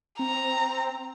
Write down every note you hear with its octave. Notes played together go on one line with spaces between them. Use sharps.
C4 A#5